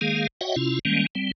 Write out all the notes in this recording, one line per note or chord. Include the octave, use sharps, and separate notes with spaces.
D#3 G#3 A#3 G#4 F5
F#4 C#5 D#5 E5 F#5 G5
C3 C#4 E4 F4
D#3 G3 G#3 A#3 C#4
G3 C4